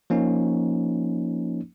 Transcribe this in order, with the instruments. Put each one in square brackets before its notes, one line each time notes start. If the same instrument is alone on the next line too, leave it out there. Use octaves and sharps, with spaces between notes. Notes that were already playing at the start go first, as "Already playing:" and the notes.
[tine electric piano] F3 A#3 C#4 D#4